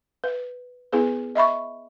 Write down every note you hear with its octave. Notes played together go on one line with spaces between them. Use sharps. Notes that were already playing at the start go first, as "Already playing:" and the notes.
B4
B3 E4 G#4 B4
D#5 E5 B5 C#6